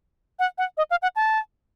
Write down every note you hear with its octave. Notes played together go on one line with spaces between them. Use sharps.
F#5
F#5
D#5
F5
F#5
A5